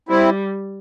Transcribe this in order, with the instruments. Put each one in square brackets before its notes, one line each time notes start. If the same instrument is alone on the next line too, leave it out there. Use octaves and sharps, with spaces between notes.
[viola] G3 [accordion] C4 E4